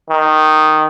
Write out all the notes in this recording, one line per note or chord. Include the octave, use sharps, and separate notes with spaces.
D#3